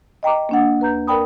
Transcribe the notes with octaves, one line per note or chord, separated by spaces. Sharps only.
D#5 G5 A#5 D6
A#3 D4 F#5
D#2 B4 A#5 G6
A#4 B4 D5 G5 B5 D#6